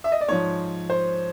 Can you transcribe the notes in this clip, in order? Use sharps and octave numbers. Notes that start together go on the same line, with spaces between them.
E5
D#5
D5
G#2 F3 C#5
C5